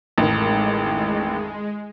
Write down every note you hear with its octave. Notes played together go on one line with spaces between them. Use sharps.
A1 F2 D#3 G#3